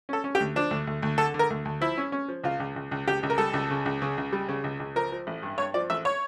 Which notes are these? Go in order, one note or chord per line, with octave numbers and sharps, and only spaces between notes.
C#4 A4
C#4
G4
D2
F3 D4
D2
D2
D2
D3 A4
D3
A#4
D2
D2
F3 E4
C#4
C#4
F3
C#2 F4
C#2
C#2
C#2
C#2 G4
C#2
A#4
G3 A4
C#2
C#3
C#2
C#3
C#2
G3
C#3
C#2
C#2
F3 A#4
F3
A1
G2
G2 C#5
F3 D5
A1 E5
C#5